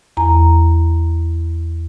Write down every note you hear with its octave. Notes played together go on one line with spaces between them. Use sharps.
E2 A#5